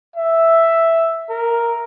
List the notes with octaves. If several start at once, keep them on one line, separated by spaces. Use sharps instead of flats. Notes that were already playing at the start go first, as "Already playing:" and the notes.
E5
A#4